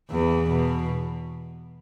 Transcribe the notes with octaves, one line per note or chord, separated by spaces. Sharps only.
E2 E3
B2